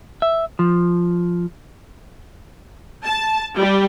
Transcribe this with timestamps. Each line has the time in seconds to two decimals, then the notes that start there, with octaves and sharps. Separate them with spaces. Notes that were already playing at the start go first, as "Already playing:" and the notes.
0.22 E5
0.59 F3
3.05 A5
3.57 G3